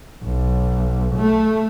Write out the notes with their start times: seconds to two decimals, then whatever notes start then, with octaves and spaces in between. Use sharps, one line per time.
0.24 B1
1.16 A3